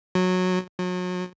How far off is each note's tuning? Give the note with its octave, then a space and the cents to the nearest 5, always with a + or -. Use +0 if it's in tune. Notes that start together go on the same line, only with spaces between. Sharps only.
F#3 -15
F#3 -35